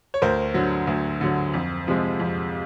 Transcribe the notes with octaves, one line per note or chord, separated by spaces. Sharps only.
C#5
D2 A#4 C5
D3 F#3
D2
D3 F#3
F2
C3 F3 G#3
F2